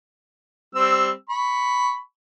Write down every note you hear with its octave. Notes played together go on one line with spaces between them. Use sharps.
G3 C4 E6
B5 C#6